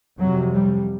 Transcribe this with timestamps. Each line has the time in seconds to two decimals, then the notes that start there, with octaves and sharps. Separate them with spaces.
0.18 F2 C3 F#3
0.54 G3